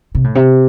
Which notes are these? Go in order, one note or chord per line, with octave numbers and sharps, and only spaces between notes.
C3
A2
C3